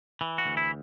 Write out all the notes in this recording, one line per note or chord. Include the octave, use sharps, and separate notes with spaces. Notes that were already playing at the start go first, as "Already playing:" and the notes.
E3
F#4
D2
E4